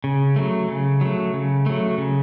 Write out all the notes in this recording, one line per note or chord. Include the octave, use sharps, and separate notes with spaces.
C#3
F#3 A3
C#3
F#3 A3
C#3
F#3 A3
C#3